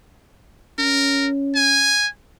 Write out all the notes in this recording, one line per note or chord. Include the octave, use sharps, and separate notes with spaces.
C#4 A#4
G#5